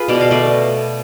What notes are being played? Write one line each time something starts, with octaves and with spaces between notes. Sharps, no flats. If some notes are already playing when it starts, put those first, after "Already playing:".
Already playing: F4 G#4 B4
B2 D5
F5
A3 B4 D5